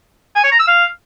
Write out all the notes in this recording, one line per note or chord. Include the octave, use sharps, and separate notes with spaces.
G#5
C#5
A#5
E6
F5